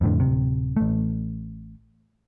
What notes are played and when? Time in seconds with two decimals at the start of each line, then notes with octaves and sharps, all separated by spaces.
0.01 F2 A2 D3
0.20 D1 C3
0.77 A1 A3